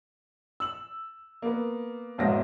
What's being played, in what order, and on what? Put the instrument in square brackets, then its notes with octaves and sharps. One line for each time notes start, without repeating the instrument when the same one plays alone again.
[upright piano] E6 F#7
A#3 B3
E1 B1 G#2 E5 A#6